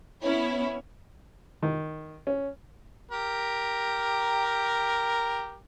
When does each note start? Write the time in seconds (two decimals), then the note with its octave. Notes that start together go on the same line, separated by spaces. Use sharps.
0.22 B3 C#4 E4 C#5
1.62 D#3
2.27 C#4
3.11 G4 A#4